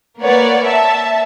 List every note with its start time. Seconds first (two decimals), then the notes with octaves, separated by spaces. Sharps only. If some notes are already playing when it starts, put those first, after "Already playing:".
0.20 A#3 A#4 B4 C#5 D5 F#5
0.66 E5 A5